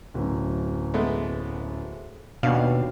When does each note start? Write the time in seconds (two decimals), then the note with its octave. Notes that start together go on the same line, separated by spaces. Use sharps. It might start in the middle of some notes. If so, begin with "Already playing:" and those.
0.14 D1 F#2
0.94 G#3 A3 B3
2.43 D#2 B2 D4 F5